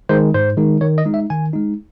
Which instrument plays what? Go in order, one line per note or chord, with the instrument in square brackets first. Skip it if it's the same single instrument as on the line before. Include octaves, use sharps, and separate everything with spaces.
[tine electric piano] D#3 G#3 D#4 C5
G#2 C5
D#3 G#3 D#4
D#3 C#5
D#5
G#3 D#4
E5
D#3 G#5
G#3 D#4